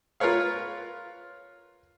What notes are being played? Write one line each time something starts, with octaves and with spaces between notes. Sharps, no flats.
F4 A#4 B4 C#5 F5